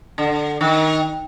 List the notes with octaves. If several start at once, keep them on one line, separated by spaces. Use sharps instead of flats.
D3
D#3